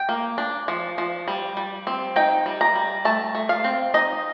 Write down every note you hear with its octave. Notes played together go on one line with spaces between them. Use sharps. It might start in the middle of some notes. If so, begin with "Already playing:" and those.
Already playing: G5
A#3
D4
F3
F3
G3
G3
C4
D#4 G5
G3
A#5
G3
A3 A5
A3
F5
C4
D#4 D#5